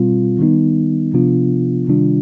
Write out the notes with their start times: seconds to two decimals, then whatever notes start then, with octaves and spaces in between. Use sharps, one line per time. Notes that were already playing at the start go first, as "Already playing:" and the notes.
Already playing: B2 G3 C4 F4
0.39 D#3 G3 B3 D#4
1.14 C3 F3 B3 D4 F4
1.88 C3 D#3 G3 D4 F4